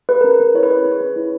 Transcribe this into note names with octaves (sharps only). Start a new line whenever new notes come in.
G#4 B4
C#4 A#4
B4
C#4
E4 C#5
B4
G#4 C#5
C#4
C#5
C#4 B4
E4